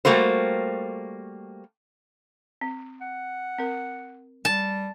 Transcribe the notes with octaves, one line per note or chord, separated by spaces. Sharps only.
G3 A3 A#3 F#4 C5
C4
F#5
C4 A#4
G3 A5